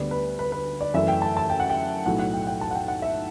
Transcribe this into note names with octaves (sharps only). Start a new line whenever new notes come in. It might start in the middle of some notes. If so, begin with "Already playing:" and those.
Already playing: D2 D3 G3 B3 D5
B4
B4
B4
D5
F#2 E3 A3 E5
G5
A5
A5
G5
F#5
G5
B1 A2 F#3 A3 F#5
F#5
G5
G5
A5
F#5
G5
F#5
E5